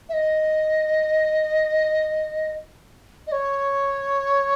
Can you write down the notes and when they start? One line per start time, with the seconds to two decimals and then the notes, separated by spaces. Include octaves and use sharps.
0.09 E5
0.13 D#5
3.27 D#5
3.32 C#5